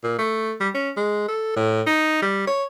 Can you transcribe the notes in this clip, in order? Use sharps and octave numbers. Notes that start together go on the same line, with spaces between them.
A#2
A3
G3
C#4
G#3
A4
A2
D#4
G3
C#5